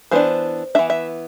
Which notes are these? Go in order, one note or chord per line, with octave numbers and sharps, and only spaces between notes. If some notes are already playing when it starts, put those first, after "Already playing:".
E3 B3 D4 C5
E3 B3 D4 E5
E5